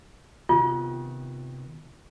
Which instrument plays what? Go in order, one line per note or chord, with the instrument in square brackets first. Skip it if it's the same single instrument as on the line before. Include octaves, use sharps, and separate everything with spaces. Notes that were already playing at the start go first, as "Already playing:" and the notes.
[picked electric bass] C3 D#3 B3 [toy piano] F4